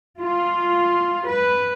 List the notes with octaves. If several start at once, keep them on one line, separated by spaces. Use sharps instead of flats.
F4
B4